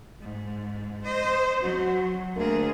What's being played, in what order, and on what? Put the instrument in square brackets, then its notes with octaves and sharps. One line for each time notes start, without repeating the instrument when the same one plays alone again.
[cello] G#2
C5 D#5
[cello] F#3 [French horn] F#4
[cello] D2 G#4 [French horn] A#3